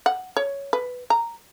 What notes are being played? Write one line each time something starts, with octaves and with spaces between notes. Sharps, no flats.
F#5
C#5
B4
A#5